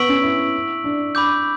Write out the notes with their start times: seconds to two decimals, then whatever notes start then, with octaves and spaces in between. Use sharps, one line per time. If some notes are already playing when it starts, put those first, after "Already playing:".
Already playing: B3 C#6 E6 B6 D7 F#7
0.09 C#4
0.23 E4
0.84 D4
1.15 B5 D6 G6